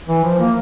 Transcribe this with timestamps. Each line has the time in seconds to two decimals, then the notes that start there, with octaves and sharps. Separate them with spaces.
0.07 E3
0.24 F3
0.39 A#3